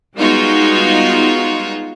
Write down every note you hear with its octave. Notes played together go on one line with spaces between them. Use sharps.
G3 G#3 B3 D#4 F4 F#4